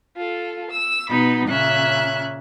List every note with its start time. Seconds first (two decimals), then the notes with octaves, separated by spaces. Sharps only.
0.18 F4 A4
0.72 E6
1.10 B2 B3 D#4 B5
1.48 A#2 C#3 C#4 E5 F#6